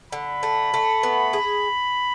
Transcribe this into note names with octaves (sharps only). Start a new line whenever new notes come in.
D3 B5
A3
A3
B3
G#4